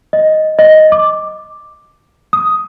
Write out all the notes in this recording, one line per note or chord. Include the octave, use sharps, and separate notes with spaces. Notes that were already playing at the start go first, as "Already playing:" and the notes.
D#5
D#5
D6
D#6